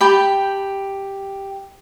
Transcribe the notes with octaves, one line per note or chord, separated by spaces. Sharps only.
G4 G5 A5 B5